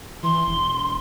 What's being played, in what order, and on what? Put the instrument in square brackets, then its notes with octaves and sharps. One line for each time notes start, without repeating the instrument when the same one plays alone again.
[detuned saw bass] E3 [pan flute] C6
[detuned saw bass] E1